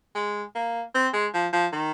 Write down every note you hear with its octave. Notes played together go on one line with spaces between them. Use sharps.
G#3
A#3
C4
G#3
F3
F3
D#3